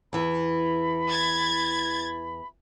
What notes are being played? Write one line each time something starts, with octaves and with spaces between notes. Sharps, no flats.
E2 E3 B5
G#6 A6